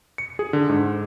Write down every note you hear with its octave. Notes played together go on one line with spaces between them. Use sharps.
C#7
G#4
D3
G#2